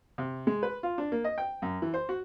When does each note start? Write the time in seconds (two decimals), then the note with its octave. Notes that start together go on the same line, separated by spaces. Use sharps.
0.18 C3
0.47 G#3
0.63 B4
0.83 F4
0.98 D4
1.12 A#3
1.24 D#5
1.38 G5
1.62 F#2
1.82 E3
1.94 C5
2.09 F#4